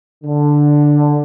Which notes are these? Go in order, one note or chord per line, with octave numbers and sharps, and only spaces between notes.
D3